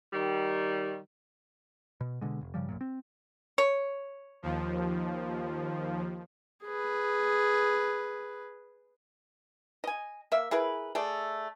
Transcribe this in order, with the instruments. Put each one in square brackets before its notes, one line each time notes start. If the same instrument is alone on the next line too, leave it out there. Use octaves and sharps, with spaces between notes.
[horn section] D#3 G3
[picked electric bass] B2
B2 D3 G#3
F1
G2 C#3 F3 G3
B1 F#2 A#2
C4
[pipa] C#5
[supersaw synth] D#2 F3
[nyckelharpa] G#4 B4
[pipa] D#5 G#5
A#3 E5
E4 G#4 A#4 B4
A3 G#4 D5